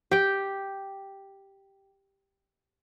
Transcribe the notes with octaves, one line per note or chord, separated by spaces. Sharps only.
G4 G5